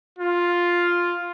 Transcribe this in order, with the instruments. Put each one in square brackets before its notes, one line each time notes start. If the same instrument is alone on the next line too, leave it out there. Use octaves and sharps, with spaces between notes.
[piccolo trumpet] F4